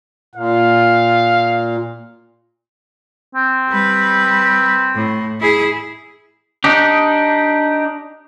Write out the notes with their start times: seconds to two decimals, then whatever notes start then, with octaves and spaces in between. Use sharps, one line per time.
0.35 A#2 F5
3.35 C4
3.70 G3 B4
4.95 A2
5.40 E4 G#4
6.64 D4 D#4 G4